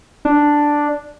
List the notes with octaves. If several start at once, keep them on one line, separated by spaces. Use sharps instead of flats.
D4